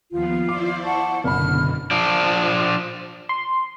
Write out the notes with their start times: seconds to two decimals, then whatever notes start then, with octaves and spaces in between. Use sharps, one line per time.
0.11 D#2 F3 B3 F4
0.49 E4 C5 D5 D6
0.84 F#5 A5 C#6
1.24 F#1 B2 D3 B5 F6
1.91 F3 D4
3.29 C6